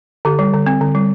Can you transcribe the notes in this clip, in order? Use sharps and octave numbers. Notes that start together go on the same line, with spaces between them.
D3 G4
G3
D3
C4
D3
G3